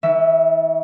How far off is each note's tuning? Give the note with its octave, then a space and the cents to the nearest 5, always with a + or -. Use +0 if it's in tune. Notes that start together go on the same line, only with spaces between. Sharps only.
E3 -45 E5 +0